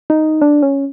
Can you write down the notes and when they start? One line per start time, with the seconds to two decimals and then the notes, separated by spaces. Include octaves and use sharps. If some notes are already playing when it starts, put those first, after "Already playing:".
0.10 D#4
0.42 D4
0.63 C#4